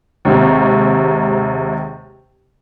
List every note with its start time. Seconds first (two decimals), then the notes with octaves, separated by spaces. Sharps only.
0.25 D#2 G#2 C3 C4